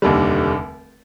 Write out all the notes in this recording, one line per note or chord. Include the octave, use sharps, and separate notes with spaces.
F1 D#2 D3 G3